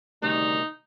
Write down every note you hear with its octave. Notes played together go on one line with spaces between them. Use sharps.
D2 C3 D#3 G3 D#4